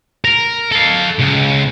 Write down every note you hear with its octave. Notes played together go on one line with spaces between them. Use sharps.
A#4
A4 F5
C#2 C#3